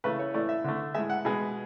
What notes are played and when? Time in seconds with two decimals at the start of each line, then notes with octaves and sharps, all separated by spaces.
0.04 C#3 E3 A3 B4
0.19 C#5
0.34 A2 E3 A3 D5
0.49 E5
0.64 D3 A3
0.94 A2 G#3 E5
1.10 F#5
1.25 B2 G#3